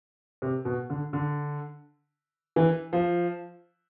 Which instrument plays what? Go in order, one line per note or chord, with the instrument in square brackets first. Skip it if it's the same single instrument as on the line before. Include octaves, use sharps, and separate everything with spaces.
[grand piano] C3
B2
D3
D3
E3
F3